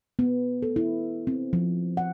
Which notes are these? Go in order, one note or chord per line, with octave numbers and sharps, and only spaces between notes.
B3
A4
E4
C4
F3
F#5